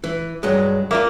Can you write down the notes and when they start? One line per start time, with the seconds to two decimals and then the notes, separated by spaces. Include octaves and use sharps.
0.04 E3
0.43 G2 F#3 G#3
0.91 A#3 F4 D5 E5